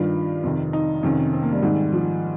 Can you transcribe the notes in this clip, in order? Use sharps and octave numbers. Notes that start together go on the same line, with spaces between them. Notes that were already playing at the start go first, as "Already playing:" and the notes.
Already playing: G2 D#3 F4
F2 C3 D#3
D#4
F2 C3 D#3 C#4
C4
A#3
G3
G#2 D#3
F3